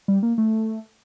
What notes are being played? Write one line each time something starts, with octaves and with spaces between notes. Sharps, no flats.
G3
A#3
A3